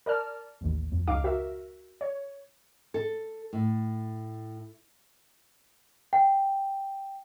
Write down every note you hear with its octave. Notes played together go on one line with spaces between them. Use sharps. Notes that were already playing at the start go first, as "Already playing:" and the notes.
A#4 D5 A5 F6
A1 D#2
F2
C#2 D#4 F5 D6
F#4 A#4 E5
C#5
A4
A2
G5